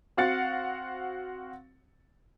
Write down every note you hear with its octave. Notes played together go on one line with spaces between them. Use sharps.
C4 F#4 F5 F#5 A6 C#7